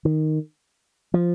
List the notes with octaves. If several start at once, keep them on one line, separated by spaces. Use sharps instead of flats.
D#3
F3